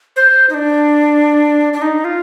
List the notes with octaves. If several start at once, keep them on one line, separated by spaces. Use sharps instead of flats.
C5
D#4
D4
D4
D#4
F4